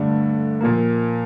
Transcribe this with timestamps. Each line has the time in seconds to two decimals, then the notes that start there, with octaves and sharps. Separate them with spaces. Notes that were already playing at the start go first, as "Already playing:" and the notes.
Already playing: G2 D3 A3 D4
0.61 A#2 F3 A#3